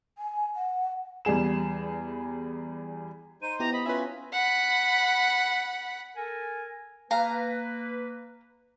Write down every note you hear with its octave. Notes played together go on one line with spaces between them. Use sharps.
G#5
F#5
E2 G3 G#4 E7
D#4 C5 D#7
B3 E4 G4 A#5
D#5 B5
C#4 F4 B4 E5 G#5
F#5 B5
A4 A#4 G#5
A#3 B4 F5 A#5